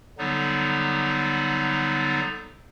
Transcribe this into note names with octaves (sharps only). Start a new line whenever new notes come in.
D3 F#3 G3 B3 D#4